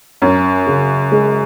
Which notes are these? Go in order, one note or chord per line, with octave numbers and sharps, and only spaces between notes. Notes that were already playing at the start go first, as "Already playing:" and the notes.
F#2 C#4
C#3
G#3